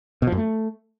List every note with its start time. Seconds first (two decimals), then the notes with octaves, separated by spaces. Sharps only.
0.22 B2
0.27 F3
0.32 F#2
0.37 A3